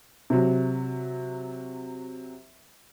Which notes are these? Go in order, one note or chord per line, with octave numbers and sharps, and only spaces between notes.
C3 F#3